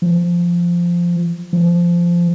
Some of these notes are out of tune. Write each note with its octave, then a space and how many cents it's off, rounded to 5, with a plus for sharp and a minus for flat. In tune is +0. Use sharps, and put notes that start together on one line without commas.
F3 -10
F3 -15